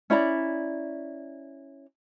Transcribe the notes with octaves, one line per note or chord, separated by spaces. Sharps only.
C#4 E4 D5 A#5